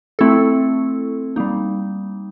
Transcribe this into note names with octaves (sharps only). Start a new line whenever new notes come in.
A3 C4 E4 A4
G3 A#3 D#4